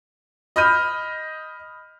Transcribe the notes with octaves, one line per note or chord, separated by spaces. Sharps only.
D#5 B5 F6 G6 D#7